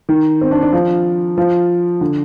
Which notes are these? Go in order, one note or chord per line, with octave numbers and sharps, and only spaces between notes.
D#3
C4
D4
D4
F3
F3
D3